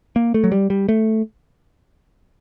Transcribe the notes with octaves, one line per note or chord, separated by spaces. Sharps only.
A#3
A3
F#3
G3
G3
A3